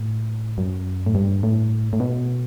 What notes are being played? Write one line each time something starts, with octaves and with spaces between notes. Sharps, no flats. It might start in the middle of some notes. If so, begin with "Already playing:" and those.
Already playing: A2
F#2
A2
G2
A2
A2
B2